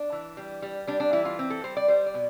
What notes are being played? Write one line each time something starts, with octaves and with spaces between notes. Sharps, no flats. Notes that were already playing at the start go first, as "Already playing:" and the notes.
Already playing: D4
E3
G3
G3
G3 D4
D4
E3 E4
F4
C4
A4
G3 C5
D5
G3 C5
D5
B2